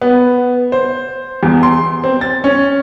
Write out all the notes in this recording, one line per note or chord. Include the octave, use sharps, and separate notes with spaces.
B3
C5
E2
C6
C4
A6
C#4